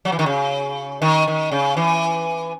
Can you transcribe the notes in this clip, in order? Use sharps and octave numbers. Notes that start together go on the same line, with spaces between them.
F#3
E3
D#3
C#3
D#3
D#3
C#3
E3